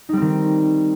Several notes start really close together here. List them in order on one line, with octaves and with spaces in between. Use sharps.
D#4 G3 C4 D#3